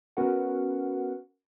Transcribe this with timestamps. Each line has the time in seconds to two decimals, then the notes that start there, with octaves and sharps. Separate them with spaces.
0.17 B3 C#4 F#4 A#4 B4 F#5